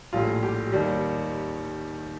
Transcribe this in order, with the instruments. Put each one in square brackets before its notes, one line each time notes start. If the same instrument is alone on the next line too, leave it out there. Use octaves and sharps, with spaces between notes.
[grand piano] A#1 A2 G3 F4
G4
D#2 D#3 G3